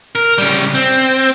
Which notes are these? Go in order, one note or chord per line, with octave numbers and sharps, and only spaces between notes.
A#4
C#3 G3
C4